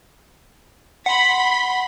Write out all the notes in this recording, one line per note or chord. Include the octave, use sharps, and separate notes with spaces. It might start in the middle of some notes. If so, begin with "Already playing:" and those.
F#5 B5 C6 B6